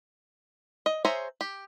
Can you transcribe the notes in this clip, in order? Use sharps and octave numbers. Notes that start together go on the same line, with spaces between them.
D#5
G#4 C5 C#5 E5 A#5
G4